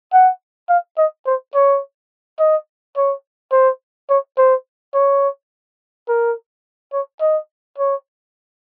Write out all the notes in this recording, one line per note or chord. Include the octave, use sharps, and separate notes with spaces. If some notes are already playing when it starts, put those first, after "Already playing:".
F#5
F5
D#5
C5
C#5
D#5
C#5
C5
C#5
C5
C#5
A#4
C#5
D#5
C#5